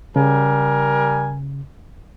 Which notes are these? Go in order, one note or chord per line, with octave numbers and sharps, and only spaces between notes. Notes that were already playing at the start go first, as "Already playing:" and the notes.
C#3 G3 A#4 G#5